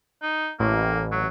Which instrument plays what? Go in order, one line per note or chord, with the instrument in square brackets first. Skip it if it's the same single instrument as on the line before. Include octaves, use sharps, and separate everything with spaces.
[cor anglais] D#4
[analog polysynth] A1 [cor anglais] A#3
[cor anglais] F#3